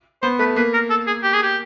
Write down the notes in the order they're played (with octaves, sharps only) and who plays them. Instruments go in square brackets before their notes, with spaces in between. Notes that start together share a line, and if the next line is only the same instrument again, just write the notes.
[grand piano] B3 [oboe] C5
[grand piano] A3 [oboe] B4
[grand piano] A#3 [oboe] B4
[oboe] A#4
A4
G#4
G4
G#4
G4